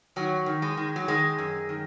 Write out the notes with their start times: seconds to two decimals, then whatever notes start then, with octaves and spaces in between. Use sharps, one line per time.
0.16 D#3 F#3
0.46 D#3
0.62 G#3
0.77 D#3
0.96 F#3
1.08 D#3 G#3
1.38 F#2
1.69 D#3